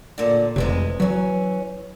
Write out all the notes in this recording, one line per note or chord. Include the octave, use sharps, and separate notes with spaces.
A#2 D3
F1 D2 C3 E3 G#3
E3 F#3 C#4